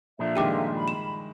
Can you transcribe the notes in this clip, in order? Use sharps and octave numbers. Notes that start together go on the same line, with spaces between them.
A#2 F3 D4 F4 A4 E5
G2 D#3 G#3 G4 G5 D6
B5
E7